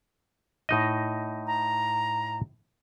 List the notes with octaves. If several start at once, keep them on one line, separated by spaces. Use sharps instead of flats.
A2 D#4 D#5
A#5